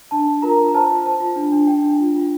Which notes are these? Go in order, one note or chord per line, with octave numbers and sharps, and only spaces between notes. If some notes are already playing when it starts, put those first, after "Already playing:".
D4 A5
D4
F4 A#4 A#5
F4
A#5
C5 A5
F4
C5 A5
F4
D4
D4
D4 G5
D4
F4
F4